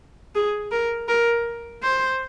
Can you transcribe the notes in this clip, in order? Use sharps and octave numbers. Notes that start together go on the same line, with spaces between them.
G#4
A#4
A#4
C5